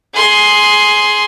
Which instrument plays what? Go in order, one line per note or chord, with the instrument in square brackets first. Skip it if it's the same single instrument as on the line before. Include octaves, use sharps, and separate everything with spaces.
[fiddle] G#4 C6